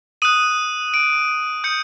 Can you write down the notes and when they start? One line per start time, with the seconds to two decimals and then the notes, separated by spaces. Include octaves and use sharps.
0.22 D#6 F#6 D#7
0.94 D7
1.64 D#6 G6 C#7